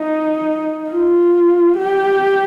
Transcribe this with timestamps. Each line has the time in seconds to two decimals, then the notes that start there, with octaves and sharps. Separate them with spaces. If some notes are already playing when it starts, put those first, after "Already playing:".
Already playing: D#4
0.91 F4
1.77 G4